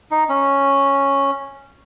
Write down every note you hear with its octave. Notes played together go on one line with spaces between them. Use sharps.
D#4
C#4